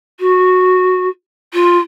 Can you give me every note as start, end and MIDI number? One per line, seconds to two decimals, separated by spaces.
0.20 1.08 66
1.54 1.78 65